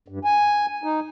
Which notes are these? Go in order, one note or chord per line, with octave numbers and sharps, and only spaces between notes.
G2
G#5
D#4